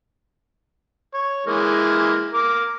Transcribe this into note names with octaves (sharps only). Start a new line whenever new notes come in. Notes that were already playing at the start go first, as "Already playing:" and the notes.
C#5
E3 G#3 A#3
A#4 D6